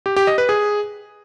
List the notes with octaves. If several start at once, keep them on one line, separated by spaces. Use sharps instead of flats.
G4
G4
D#5
B4
G#4